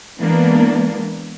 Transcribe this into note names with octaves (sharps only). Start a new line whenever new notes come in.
E3 G#3 A#3 B3 D4